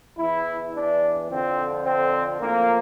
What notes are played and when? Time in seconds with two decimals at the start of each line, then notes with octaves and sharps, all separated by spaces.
0.17 E2 E3 E4
0.73 D4
1.28 F2 D3 F3 C4
1.84 C4
2.40 A2 F3 A#3